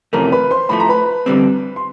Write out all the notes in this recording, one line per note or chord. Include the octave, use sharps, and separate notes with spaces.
F2 C3 E3 A3 C#4 A#4 A#5
B4 B5
C5 C6
A2 F3 A3 B5
A#5
B4 B5
F2 D3 G3 C4
C6